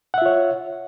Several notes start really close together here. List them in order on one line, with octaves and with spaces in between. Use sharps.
F#5 E5 F4 C#5